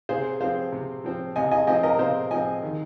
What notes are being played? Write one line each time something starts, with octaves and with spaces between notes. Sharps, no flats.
C3 G#4 C5
F3 C4 C5 F5
C3
F3 C4
C3 D#5 G#5
D#5 G#5
F3 C4 D#5 G#5
A#4 D#5
C3 C5 F5
F3 C4 D#5 G#5
D#3